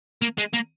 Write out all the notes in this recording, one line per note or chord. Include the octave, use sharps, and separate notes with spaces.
A#3
G#3
A#3